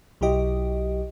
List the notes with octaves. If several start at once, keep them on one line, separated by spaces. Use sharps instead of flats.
B1 F#3 E4 G4 D#5